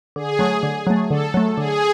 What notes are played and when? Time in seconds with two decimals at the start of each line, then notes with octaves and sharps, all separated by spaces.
0.16 D3 G#4
0.39 F#3 A3
0.63 D3
0.87 F#3 A3
1.10 D3 A4
1.34 F#3 A3
1.58 D3 G#4